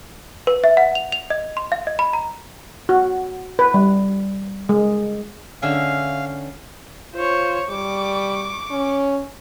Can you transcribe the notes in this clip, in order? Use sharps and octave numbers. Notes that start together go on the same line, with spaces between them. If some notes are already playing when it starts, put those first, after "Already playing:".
B4
E5
F#5
F7
F7
D#5
C6
F5
D#5
B5
A#5
F#4
B4
G3
G#3
D3 C#4 E5 F5
F4 C5 C#5
G3 C#6 D6
C#4